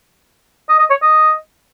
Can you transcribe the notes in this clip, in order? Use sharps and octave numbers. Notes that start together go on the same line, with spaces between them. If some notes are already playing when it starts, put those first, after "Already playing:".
D#5
D#5
C#5
D#5